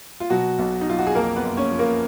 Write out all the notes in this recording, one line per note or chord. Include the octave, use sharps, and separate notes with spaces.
F4
B2 F#3 F#4
B1
D#4
F#3 F4
F#4
G#4
F2 A#3 A#4
B3 B4
F#1
C#4 C#5
F3
A#3 A#4